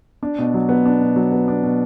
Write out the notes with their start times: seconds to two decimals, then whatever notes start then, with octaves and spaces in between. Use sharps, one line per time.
0.23 D4
0.39 B2
0.54 F#3
0.69 B3
0.86 D4
1.01 B2
1.16 F#3
1.32 B3
1.48 D4
1.63 B2